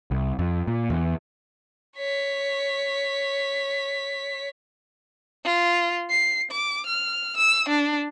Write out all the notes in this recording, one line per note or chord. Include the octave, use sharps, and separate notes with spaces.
C2
F2
A#2
E2
C#5 B6
F4
C7
D6
F6
E6
D4